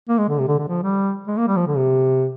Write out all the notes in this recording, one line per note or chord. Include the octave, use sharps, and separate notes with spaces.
A#3
G#3
D3
C3
D3
D3
F3
G3
G#3
A#3
G3
F3
D3
C3